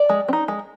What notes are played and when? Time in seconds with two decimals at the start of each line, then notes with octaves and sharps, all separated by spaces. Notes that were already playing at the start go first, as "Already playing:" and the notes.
Already playing: D5
0.09 G#3
0.28 C4
0.33 D#4
0.48 G#3